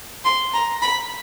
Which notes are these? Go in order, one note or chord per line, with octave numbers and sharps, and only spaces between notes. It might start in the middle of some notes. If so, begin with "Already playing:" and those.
C6
A#5
B5